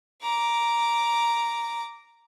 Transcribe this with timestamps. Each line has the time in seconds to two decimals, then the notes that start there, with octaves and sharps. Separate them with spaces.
0.22 A#5 D6